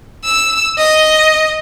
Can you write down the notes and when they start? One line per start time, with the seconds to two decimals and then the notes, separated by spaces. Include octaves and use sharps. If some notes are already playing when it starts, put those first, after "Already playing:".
0.25 E6
0.78 D#5